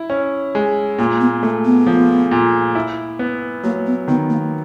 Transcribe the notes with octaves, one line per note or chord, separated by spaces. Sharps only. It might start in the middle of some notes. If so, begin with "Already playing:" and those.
Already playing: E4
C#4
G#3
A#2 A#3
B3
A3 A#3
B3
F3
A#2
E4
B3
F#3 A#3
B3
D#3 B3
A#3